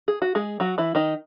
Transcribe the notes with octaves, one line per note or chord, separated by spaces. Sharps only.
G#4
F#4
G#3 G#4
F#3 F#4
E3 E4
D#3 D#4